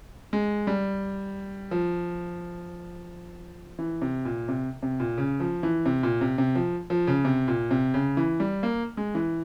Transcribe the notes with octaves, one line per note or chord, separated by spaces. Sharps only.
G#3
G3
F3
E3
C3
A#2
C3
C3
A#2
C#3
F3
E3
C3
A#2
C3
C3
F3
F3
C#3
C3
A#2
C3
C#3
E3
G3
A#3
G#3
E3